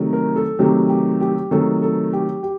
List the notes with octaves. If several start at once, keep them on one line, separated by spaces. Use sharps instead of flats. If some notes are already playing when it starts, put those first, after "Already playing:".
Already playing: C3 D#3 F#3 A3
A#4
A4
C3 D#3 F#3 A3 G4
G4
G4
C3 D#3 F#3 A3 A4
A4
G4
G4